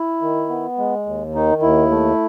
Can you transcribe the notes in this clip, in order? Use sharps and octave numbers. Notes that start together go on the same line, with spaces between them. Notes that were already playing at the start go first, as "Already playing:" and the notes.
Already playing: E4
D#3
B3
G#3
D#2
D#3 D#4
D#2 E4
A3